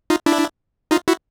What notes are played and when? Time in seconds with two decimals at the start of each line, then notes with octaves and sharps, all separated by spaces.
0.10 D#4 F4
0.26 D4 E4
0.91 D#4 F4
1.08 E4 F#4